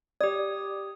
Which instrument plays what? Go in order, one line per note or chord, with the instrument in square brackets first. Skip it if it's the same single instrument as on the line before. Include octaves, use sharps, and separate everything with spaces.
[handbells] G4 D#6 [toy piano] D5